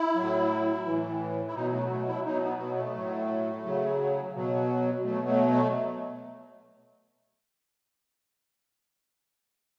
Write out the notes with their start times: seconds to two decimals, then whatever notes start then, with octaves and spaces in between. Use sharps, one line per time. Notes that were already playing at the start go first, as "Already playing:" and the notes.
Already playing: E4
0.15 A2 F#3
0.86 A2 E3
1.47 E4
1.55 B2 F#3 D#4
1.73 A3
1.90 A3
2.08 E4
2.25 B2 F#3 D#4
2.43 B3
2.60 B3
2.77 A3
2.95 A2 F#3
3.65 C#3 F#3
4.35 B2 F#3
5.04 B2 F#3 A3
5.28 A3
5.51 A3